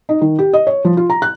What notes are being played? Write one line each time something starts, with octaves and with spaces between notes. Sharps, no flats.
D#4
D#3
G4
D#5
C#5
F3
F4
A#5
F#6